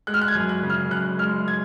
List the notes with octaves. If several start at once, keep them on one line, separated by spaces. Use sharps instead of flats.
G#3 F#6
F6
F#6
G#6
F#2
F#6
C#3
F6
F#2 F#6
G#3 F6
G#6